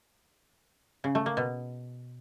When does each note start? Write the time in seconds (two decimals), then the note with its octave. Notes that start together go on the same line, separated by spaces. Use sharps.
1.04 C#3
1.15 A3
1.26 A#3
1.37 B2